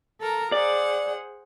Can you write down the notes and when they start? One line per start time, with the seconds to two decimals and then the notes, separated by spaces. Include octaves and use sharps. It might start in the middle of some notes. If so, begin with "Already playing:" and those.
0.20 A4 A#4 A#5
0.52 G#4 C5 D5 F#5